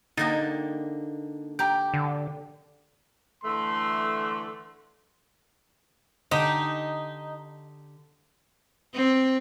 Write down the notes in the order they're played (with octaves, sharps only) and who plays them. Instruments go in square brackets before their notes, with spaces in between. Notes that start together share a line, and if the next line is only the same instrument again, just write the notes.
[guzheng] D3 A#3 G4 [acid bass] D#4 [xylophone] A6 A#6
[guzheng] G4 [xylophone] G5 A#5 G6
[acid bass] D3
[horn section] D3 E3 A3 [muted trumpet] C6
[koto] D3 G4 [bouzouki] D#4
[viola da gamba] C4